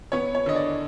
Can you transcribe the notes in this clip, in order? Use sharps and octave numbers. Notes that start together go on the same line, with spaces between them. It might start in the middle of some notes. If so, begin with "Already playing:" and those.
B3 C#5
C#5
D3 D#5
D5